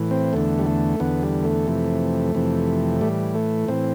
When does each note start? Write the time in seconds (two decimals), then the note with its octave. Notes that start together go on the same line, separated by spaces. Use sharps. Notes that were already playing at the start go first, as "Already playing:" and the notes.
Already playing: A2 E3
0.11 C4
0.33 E2 D3 A3
0.59 G3
0.66 A3
1.00 E2 D3 B3
1.23 G3
1.44 A3
1.67 F2 C3 E3
2.35 F2 C3 E3
3.01 A2 E3 G3
3.35 A3
3.68 A2 E3 C4